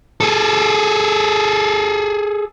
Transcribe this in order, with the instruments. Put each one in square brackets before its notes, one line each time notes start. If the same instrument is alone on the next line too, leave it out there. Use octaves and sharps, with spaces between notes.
[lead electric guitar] G#4 A4